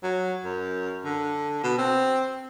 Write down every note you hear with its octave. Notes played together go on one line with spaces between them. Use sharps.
F#3
F#2
D3
B2
C4